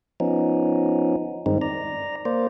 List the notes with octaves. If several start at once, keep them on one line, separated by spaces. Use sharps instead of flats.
F3 B3 C#4 D#4
G2 D#3 G#3 C4 D#4
D5 A#5
A#3 C5 D5